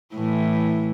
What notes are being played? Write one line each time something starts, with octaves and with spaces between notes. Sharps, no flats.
A2 E3